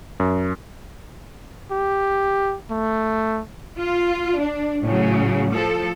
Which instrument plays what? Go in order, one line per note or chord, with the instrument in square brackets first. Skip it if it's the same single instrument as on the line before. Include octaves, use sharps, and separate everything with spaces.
[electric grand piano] F#2
[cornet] G4
A3
[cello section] F4
D4
A2 C#3 F#3
F3 A4